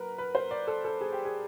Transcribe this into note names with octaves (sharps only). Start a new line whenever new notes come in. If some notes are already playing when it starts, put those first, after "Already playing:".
Already playing: F#3 A#4 B4
B4
C5
D5
A4
A4
G#4
G4
G#4